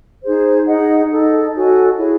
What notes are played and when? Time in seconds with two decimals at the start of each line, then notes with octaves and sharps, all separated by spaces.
0.23 D#4 G#4 C5
0.66 D#4 G#4 D#5 F#5
1.10 D#4 A4 D#5
1.54 F#4 A4 C#5 G#5
1.97 E4 G#4 C#5